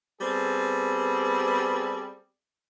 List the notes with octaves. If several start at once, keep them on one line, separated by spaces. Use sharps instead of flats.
G3 B3 C4 G#4 A4